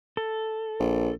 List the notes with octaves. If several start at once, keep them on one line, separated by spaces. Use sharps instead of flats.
A4
A#1